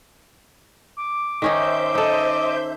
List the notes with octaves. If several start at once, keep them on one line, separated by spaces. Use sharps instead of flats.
D6
D#3 C#4 D#4 C5 E5 G6
D#4 A4 D#5